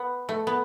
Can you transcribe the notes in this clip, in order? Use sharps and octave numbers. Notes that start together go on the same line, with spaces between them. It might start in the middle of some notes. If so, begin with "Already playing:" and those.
Already playing: B3
A3
B3